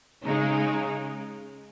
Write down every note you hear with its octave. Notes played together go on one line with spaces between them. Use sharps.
C#3 G#3 D#4